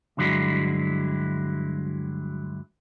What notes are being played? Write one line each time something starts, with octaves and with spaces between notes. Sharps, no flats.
D2 G2 D3 F#3 G#3 E4